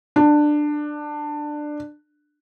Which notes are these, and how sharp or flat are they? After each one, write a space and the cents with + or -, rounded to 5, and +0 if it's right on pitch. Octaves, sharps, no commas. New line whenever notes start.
D4 +15